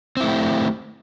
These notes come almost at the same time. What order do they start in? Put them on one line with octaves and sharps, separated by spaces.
C4 E4 A3 G4